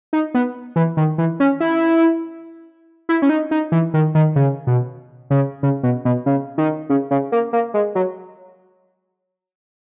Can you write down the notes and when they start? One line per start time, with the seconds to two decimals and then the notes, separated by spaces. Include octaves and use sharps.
0.13 D#4
0.34 B3
0.76 E3
0.97 D#3
1.18 E3
1.40 C#4
1.60 E4
3.09 E4
3.22 C#4
3.29 D#4
3.51 D#4
3.72 E3
3.94 D#3
4.15 D#3
4.36 C#3
4.67 B2
5.30 C#3
5.63 C#3
5.83 B2
6.05 B2
6.26 C#3
6.58 D#3
6.90 C#3
7.11 C#3
7.32 A#3
7.53 A#3
7.74 G#3
7.95 F#3